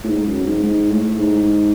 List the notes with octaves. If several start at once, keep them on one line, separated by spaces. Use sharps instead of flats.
A2
G#2
F#2
G#2
G#2
A2
G#2